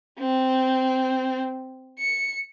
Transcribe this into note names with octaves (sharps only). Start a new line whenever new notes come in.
C4
C#7